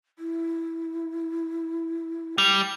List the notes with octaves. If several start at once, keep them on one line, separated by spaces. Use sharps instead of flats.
E4
G3 G5 F7